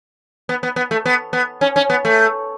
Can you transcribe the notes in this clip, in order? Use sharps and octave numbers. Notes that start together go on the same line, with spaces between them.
B3
B3
B3
A3
B3
B3
C#4
C#4
B3
A3